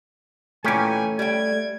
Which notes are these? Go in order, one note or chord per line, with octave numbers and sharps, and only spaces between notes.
A#2 E3 A3 C#4 G4 G#5
G3 G5 G#6